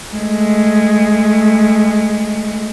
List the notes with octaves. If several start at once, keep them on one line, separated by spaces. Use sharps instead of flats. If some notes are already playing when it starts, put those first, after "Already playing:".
G#3 A3